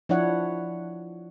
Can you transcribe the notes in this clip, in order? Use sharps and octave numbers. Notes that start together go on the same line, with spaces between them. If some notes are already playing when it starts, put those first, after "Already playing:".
F3 D4 E4 C#5 F#5